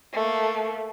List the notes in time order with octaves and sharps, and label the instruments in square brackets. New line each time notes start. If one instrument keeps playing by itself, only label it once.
[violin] A3 A#3